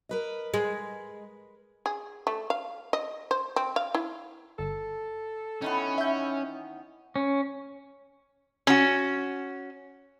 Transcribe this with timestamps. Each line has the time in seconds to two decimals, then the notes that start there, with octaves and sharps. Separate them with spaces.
0.09 A#4 B4 D#5
0.54 G#3
1.86 G#4
2.27 A3
2.50 F5
2.93 D#5
3.31 C5
3.56 C4
3.76 F5
3.95 E4
4.59 G1 A4
5.62 D#3 E3 B3 C#4
5.98 E5 G6
7.16 C#4
8.67 C#4 F#4